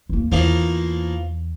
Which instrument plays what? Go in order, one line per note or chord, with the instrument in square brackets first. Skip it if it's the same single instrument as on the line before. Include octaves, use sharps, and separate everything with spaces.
[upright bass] E2 A#3
[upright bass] E2 [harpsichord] E3 F3 A#3